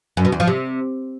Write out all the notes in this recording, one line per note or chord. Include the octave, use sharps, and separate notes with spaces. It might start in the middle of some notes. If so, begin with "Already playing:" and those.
F#2
B2
E2
F3
C3